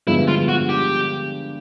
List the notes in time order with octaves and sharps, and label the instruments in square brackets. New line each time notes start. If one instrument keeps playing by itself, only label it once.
[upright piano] G2 D3 F3 G#3 B3 [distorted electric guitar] E4
[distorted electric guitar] F4
F#4
G4